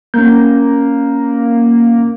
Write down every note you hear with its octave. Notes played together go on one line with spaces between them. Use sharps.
A#3 C#4 G6